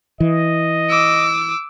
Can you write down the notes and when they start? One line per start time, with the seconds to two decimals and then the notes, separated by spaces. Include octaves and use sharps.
0.20 E3 D#5
0.89 D6 E6